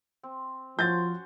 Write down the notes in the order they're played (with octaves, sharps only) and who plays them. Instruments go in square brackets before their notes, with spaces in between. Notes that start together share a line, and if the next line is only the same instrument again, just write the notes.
[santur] C4
[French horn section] F3 [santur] C#4 F#4 C6 [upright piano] G6 A6